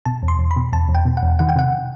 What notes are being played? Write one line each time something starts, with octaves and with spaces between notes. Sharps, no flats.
B2 A5
E2
C6
E2
B5
B2
E2 A5
E2
G5
B2
F#5
E2
D#3 F#5
G5
C3 F#5